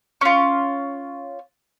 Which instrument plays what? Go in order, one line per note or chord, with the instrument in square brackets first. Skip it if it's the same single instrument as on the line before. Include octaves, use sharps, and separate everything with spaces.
[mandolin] C#4 F4